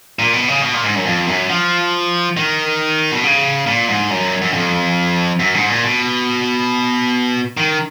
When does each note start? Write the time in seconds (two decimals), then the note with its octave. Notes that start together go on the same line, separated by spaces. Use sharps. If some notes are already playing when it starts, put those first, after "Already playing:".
0.19 A#2
0.33 B2
0.48 C#3
0.62 B2
0.74 A#2
0.84 G#2
0.95 F#2
1.06 F2
1.28 F#2
1.49 F3
2.37 D#3
3.11 B2
3.24 C#3
3.66 A#2
3.88 G#2
4.10 F#2
4.42 F#2
4.53 F2
5.40 F#2
5.54 G#2
5.69 A#2
5.84 B2
7.57 D#3